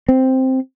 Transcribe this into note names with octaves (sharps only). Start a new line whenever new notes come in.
C4